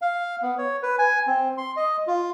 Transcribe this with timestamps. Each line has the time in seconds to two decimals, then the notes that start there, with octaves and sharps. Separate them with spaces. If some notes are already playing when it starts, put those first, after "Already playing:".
0.01 F5
0.42 B3
0.58 C#5
0.83 B4
0.99 G#5
1.27 C4
1.57 C6
1.77 D#5
2.07 F4